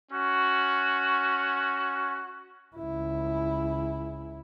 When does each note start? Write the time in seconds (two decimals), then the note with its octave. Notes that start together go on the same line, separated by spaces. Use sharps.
0.10 C#4 F#4
2.76 C#2 E4